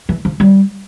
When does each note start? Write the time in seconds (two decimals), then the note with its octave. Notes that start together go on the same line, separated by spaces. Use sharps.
0.09 E3
0.25 F3
0.40 G3